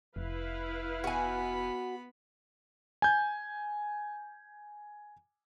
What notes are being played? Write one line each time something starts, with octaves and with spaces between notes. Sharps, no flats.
F1 E4 B4 F5
B3 F#4 G#5 B5
G#5 G6